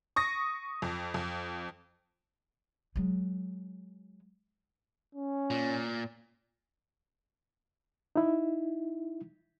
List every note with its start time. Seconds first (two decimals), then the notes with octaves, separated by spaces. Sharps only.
0.16 C#6 D#6 A#6
0.82 F2
1.14 F2
2.96 F#3 G#3
5.15 C#4
5.50 A#2
8.16 D#4 E4